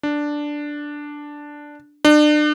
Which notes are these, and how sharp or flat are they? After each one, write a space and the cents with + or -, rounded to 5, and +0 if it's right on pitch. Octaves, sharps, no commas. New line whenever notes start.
D4 +0
D4 +35